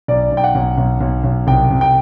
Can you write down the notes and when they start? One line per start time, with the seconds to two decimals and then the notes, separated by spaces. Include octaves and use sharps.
0.08 B1 D5
0.32 B1
0.37 G5
0.44 F#5
0.55 B1
0.78 B1
1.01 B1
1.24 B1
1.47 C2 G5
1.70 C2
1.81 G5